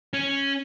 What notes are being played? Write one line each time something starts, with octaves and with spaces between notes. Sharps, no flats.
C#4